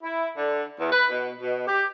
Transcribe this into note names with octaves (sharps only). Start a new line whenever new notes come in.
E4
D3
E2
B4
B2
B2
G4